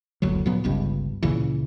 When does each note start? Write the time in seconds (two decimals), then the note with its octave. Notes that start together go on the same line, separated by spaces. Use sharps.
0.22 F#1 D2 F#3
0.46 A#2 F#3 B3
0.64 G1 C#2 G2
1.23 C#2 A#2 C#3 E3